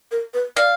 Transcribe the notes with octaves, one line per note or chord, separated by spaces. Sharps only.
A#4
B4
D5 F5